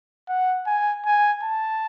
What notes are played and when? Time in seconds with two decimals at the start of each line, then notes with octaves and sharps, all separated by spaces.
0.29 F#5
0.67 G#5
1.06 G#5
1.43 A5